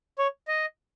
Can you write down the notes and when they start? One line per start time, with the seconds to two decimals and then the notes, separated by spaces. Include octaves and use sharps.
0.19 C#5
0.48 D#5